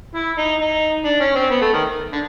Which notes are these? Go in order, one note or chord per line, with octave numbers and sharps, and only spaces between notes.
E4
D#4
D#4
D4
C#4
C4
B3
A3
D#3
D3